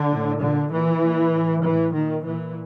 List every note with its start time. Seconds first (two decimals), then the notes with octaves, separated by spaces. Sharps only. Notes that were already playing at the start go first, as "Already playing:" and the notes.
Already playing: D3
0.09 A2
0.40 A#2 D3
0.70 A#2 E3
1.00 A#2
1.31 A2
1.62 A2 E3
1.92 A#2 D#3
2.23 A#2 E3